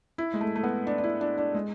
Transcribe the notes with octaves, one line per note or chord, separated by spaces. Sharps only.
E4
G#3
A3
A3
B3
D4
D4
E4
D4
D4
G#3